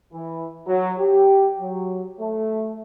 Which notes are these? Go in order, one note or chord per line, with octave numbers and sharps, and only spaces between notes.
E3
F#3
G4
F#3
A3